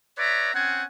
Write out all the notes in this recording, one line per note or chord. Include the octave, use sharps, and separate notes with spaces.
B4 C#5 D5 E5 A#5
C4 C#4 F#5 G#5